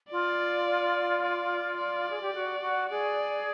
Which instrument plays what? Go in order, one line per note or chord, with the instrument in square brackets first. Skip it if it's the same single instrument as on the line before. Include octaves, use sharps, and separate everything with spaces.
[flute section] F4 [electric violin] D5
[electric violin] D5
D5
[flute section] G#4
G4
F#4
F#4
[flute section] G#4 [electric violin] D5